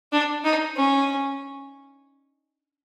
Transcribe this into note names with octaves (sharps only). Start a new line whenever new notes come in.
D4
D#4
C#4